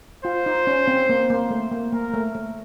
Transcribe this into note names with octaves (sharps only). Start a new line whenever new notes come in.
F4 C5
D#4
C#4
C4
A#3
A#3
A3
A#3
A#3 A#4
A3
A3